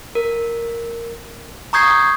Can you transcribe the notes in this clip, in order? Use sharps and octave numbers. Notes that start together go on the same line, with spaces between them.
A#4
A#5 C#6 D#6 G6 G#6 C7